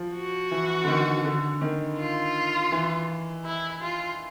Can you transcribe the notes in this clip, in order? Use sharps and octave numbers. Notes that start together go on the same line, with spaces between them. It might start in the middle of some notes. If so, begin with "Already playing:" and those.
Already playing: F3
F#4
E3
D3
D#3
D3
D#3
F4
E3
E4
F4